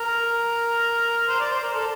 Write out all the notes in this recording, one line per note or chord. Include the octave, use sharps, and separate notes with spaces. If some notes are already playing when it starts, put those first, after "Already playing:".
Already playing: A#4
C5
D5
C5
A#4
A4